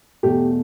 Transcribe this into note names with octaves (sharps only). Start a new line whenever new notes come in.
E2 B2 A3 G4